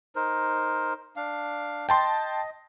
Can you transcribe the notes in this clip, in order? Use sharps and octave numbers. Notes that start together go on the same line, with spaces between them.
D#4 A#4 C5
D4 F5
D#5 G5 A5 C6